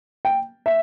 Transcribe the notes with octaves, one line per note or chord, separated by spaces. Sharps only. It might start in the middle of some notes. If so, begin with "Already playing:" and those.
G5
E5